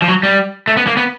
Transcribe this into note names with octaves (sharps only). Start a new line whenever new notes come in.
F3
F#3
G3
A3
B3
A#3
B3